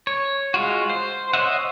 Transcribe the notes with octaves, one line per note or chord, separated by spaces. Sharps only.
C#5
G#3 F4 F#4
C5
C5 C#5 D#5 E5 F#5